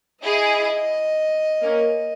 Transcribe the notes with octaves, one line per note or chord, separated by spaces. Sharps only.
E4 G#4 D#5
A#3 C#4